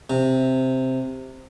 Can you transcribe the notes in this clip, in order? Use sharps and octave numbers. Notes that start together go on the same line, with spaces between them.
C3